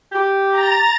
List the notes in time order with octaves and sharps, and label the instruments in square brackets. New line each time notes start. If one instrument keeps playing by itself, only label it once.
[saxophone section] G4
[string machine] A#5 A6